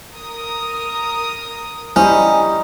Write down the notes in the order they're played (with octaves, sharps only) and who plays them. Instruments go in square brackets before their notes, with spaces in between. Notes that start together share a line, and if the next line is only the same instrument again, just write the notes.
[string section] A#4 D#6
[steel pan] G3 E4 C5 [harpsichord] C#4 [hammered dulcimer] D#4